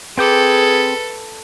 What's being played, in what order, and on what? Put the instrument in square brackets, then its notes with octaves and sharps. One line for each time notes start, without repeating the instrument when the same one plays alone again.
[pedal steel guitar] C4 G5 D6 [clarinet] G#4 [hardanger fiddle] A4 B4